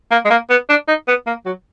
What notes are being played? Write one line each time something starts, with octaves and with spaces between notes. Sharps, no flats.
A#3
G#3
A#3
B3
D4
D#4
B3
A#3
F#3